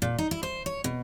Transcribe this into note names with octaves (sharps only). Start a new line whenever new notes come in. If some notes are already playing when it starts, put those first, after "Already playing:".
A#2
D#4
E4
C5
C#5
B2